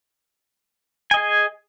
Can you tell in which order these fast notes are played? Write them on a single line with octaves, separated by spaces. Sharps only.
G#5 D#5 G#4